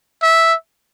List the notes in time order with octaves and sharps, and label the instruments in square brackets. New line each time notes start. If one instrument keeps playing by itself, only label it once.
[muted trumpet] E5